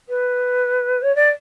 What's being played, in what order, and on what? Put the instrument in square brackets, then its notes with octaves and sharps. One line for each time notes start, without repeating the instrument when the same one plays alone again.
[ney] B4
C#5
D5